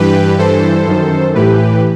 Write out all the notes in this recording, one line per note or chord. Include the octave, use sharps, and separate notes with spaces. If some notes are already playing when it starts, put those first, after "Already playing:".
Already playing: G2 E3 G4 B4
G2 E3 A4 C5
F#2 D#3
A2 E3 G4 B4